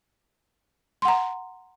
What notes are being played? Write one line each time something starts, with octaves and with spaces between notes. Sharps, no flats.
F#5 A#5 C6